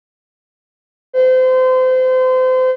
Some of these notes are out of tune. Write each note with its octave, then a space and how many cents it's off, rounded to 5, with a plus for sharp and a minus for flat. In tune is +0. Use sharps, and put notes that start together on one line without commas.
C5 -30